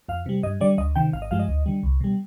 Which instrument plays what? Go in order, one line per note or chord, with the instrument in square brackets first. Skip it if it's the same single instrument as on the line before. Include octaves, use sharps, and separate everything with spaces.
[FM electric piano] F2 F5
C3 G3
G2 D#5
D3 G3 D5
D2 D#5
C3 D#3 G5
G#1 F5
D#5
G2 F3 G#3 F5
D#5
D2
D3 G3
C2
B2 G3